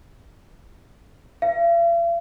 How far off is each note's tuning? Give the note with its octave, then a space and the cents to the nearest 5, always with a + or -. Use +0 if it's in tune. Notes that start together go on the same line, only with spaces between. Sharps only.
F5 -45